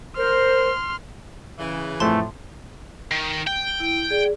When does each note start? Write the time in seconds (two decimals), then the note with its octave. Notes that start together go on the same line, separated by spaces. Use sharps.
0.17 A#4 C5 C6 F6
1.59 C#3 E3
2.00 F2 A2 A3 A5 C6
3.11 D#3
3.47 G5
3.80 E4
4.10 G#4 D5